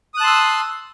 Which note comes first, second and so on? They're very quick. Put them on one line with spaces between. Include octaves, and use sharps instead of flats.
D#6 F#6 A5 C6 E6